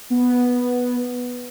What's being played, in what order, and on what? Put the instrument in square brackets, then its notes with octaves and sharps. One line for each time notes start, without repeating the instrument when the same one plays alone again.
[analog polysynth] B3